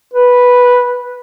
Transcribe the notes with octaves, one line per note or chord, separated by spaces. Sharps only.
B4